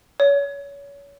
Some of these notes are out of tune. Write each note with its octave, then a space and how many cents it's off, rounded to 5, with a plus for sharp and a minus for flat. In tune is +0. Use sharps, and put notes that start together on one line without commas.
C#5 +30